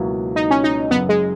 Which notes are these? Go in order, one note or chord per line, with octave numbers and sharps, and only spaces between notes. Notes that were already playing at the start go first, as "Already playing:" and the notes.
Already playing: C#2 B2 F#3 A#3 E4
D#4
C#4
D#4
F#1 F#2 C#3 B3
G#3